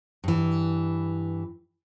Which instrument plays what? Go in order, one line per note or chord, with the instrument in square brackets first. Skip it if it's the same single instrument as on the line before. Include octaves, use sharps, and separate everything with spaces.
[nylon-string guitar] G2 E3